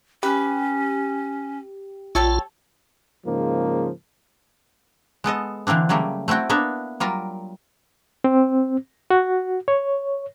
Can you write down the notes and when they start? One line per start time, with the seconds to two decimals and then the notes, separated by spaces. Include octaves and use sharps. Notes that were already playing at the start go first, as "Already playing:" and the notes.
0.23 C#4 G4 B4
2.15 A#1 G3 F4 A4 C#5
3.25 G#2 C#3 F3 A#3
5.24 G#3 B3 A4 D#5
5.67 D3 E3 A#3 C4 D4
5.89 C#3 F#3 G3 A3 A#3
6.28 A3 C4 E4 F#4 G5
6.50 A#3 B3 D4 F#4 E5
7.00 F#3 G3 F4 A#4
8.24 C4
9.10 F#4
9.68 C#5